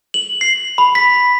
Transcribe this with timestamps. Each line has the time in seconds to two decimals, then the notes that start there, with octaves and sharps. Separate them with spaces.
0.14 F#7
0.41 C7
0.78 B5
0.95 B6